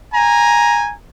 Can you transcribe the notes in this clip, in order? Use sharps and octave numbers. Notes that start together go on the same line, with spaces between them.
G#5 A#5